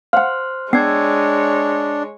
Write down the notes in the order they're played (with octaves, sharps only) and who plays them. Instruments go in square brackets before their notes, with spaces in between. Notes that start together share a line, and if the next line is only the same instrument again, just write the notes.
[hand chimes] C5 C6 F6 [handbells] F5 F#5
[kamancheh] G#3 C#5 [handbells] B3 C7 [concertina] D4 [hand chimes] G5 E6 G#6